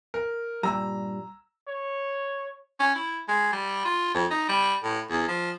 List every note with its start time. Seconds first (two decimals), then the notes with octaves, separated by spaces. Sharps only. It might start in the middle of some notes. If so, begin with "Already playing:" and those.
0.14 A#4
0.63 G2 A#2 G3 A#5 E6
1.68 C#5
2.80 C#4
2.95 E4
3.28 G#3
3.52 G3
3.85 F4
4.15 F2
4.31 D#4
4.49 G3
4.84 A2
5.10 E2
5.28 F3